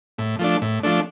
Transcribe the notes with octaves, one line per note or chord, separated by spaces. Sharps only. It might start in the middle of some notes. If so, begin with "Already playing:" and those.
A2
F3 A3 D4
A2
F3 A3 D4